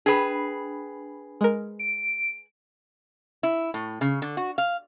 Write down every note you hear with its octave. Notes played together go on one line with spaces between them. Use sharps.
D4 G#4 B4 G5 B5
G#3 A#4
D7
E4
A2
C#3
D3
F#4
F5